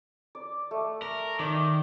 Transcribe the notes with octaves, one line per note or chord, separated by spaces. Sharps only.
D5
A3
A#4
D#3 D5